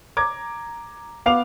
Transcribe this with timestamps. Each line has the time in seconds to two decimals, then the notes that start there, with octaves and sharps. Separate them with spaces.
0.17 A#5 D6 G#6
1.26 B3 F5 D6 F7